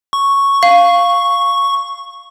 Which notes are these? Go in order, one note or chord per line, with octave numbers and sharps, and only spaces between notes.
C#6
F5